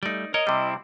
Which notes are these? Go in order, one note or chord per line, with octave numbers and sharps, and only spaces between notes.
G3 A3 D#4 D5
A#4 C#5 D#5
C3 G3 C4 E4